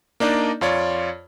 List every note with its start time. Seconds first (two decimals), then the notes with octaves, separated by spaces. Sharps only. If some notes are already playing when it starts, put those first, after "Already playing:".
0.20 A#3 D4 D#4 D5 D#5
0.61 F2 F4 C#5 D5